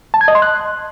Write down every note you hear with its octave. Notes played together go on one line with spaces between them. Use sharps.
A5
G#6
D#5
C6
F#6